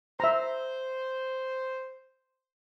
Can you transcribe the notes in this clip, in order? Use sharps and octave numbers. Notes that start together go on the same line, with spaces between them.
C5 E5 A#5